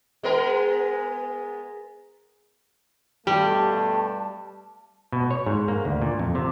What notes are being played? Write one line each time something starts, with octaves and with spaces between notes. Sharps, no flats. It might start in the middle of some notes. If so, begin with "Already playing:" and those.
G#3 B3 A#4
G2 B2 G3 A3 G4 A5
B2
C#5
G#2
A#3
D2
A#2
F2
C3